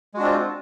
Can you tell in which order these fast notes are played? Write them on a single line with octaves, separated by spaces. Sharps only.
G#3 F#4 D4 C4 F4